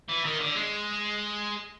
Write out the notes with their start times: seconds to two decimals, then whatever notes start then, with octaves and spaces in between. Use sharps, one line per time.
0.08 E3
0.24 D#3
0.40 D3
0.55 G#3